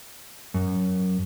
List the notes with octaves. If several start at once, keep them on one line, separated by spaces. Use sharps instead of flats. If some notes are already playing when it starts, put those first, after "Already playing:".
F#2